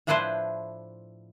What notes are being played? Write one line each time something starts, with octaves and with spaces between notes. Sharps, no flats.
A2 F3 D4 E4 B4 C5